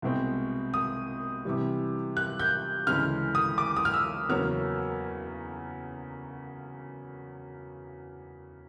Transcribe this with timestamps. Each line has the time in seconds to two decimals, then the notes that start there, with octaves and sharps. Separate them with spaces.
0.02 C2 B2 G#3 C4
0.74 D#6
1.45 C3 E3 G3
2.17 F#6
2.39 G6
2.87 D2 C#3 E3 G#3 F6
3.35 D#6
3.58 D6
3.76 D#6
3.85 F6
3.94 E6
4.29 E2 C#3 F#3 A#3 C#4 F6